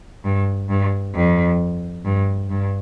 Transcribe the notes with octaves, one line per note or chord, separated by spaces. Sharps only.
G2
G2
F2
G2
G2